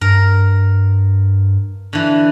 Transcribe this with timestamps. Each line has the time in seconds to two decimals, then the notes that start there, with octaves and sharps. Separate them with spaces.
0.01 G2 A#4
1.93 D3 E3